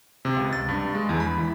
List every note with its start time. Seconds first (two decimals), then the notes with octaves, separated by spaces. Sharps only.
0.25 C3
0.37 C#2
0.53 A6
0.69 G2
0.95 G#3
1.09 E2
1.20 B5
1.38 E3